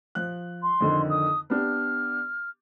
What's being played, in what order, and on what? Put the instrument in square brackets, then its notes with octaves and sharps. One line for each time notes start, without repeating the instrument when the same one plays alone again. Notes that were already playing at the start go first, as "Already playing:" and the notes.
[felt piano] F3 F#6
[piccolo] C6
[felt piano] F2 D3 D#3
[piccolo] D#6
[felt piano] B3 D4 G4 [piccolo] F6